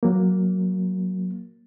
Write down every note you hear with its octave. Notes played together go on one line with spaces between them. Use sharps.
F#3 A#3